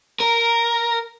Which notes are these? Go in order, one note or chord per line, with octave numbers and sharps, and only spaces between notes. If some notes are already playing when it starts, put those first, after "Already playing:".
A#4